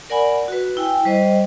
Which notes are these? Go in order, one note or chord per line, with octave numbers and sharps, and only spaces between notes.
A#4 D5 F#5 G#5 B5
F#4 B4
E4 G5 G#5
G3 C5 D#5